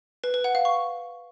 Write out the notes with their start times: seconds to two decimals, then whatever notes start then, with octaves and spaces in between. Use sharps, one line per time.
0.24 B4
0.34 B4
0.44 F#5
0.55 F5
0.65 C#6